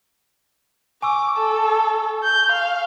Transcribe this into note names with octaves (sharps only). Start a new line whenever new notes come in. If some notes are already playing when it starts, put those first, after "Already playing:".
G#5 C#6 D6 E6
A4
G6
F5